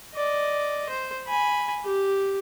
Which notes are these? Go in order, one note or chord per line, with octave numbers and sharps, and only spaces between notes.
D5 D#5
C5
G#5 B5
G4